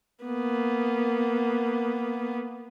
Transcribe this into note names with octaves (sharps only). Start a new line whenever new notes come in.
A#3 B3